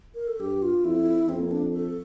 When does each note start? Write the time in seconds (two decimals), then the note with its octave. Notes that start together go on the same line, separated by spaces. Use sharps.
0.15 A#4
0.27 A4
0.40 G2 G4
0.62 F4
0.84 F2 E4
1.28 F2 C4
1.39 A#3
1.51 D4
1.73 A4